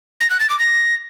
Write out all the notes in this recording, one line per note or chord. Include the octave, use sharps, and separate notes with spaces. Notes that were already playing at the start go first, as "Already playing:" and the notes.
A#6
F#6
A6
D6
A#6